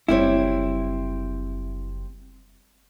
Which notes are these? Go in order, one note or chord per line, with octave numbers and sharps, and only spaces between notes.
F#1 G3 C4 E4 C#5